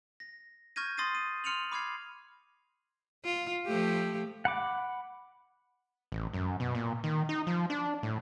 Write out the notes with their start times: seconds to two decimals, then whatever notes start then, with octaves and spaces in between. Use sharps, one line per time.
0.20 A#6
0.76 C#6 F6 G6 G#6 A#6 D#7
0.98 C6 D#6 A6 A#6 C7 D#7
1.15 D#7
1.44 C6 F6 C#7 D#7 F7 F#7
1.72 B5 D6 F6 G#6 C7
3.25 F4
3.66 F3 A3 G4
4.45 F#5 B5 D6
6.12 A1
6.33 F#2
6.60 B2
6.75 A#2
7.04 D#3
7.29 D#4
7.47 F3
7.70 D4
8.03 A2